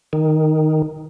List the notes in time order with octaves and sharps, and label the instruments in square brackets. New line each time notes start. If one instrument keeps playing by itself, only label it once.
[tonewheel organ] D#3